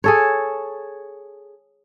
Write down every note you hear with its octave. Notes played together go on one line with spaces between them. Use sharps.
G#4 A4 C#5